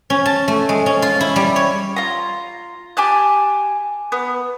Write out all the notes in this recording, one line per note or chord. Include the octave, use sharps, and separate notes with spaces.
C#4
A5
A3
G#3
C#4
F4
E4
G3
C#5
F4 A#5
G4 G#5 A5 F#6
B3